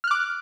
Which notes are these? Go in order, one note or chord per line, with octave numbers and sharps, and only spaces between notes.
D6 F6 F#6